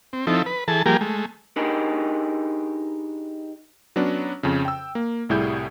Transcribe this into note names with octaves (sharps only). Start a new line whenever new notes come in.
C4
F3 C4 D#4 E4 A4
B4
E3 G#4 A4 A5
F3 G3 A#3 G4 G#4 A#4
G#3 A3
D4 D#4 G4 G#4 A#4 B4
F#3 B3 C#4 D4
F2 C#3
G5 E6
A#3
C2 A2 G3 E4 G#4 G6